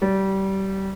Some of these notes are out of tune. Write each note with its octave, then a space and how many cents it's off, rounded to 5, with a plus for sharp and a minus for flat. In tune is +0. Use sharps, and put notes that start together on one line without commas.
G3 -25